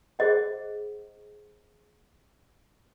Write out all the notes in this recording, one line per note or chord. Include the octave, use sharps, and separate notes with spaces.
G#4 C5 D#5 F#5